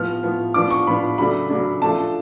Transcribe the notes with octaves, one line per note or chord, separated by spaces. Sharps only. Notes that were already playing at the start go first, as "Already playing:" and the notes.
Already playing: A2 F3 B3 F6
A2 F3 B3
A2 F3 B3 D4 D6
C#6
A2 F3 B3 D4 B5
C#3 F#3 A3 D4 B5
C#3 F#3 A3 D4
F3 A3 D4 A5